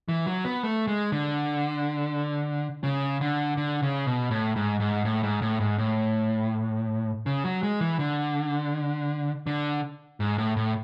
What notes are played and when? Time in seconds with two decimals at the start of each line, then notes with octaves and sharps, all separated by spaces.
0.08 E3
0.26 F#3
0.45 B3
0.63 A3
0.87 G#3
1.12 D3
2.83 C#3
3.21 D3
3.57 D3
3.83 C#3
4.06 B2
4.31 A2
4.56 G#2
4.80 G#2
5.05 A2
5.23 G#2
5.42 A2
5.60 G#2
5.78 A2
7.26 C#3
7.44 F#3
7.63 G#3
7.81 E3
7.99 D3
9.47 D3
10.20 G#2
10.38 A2
10.57 A2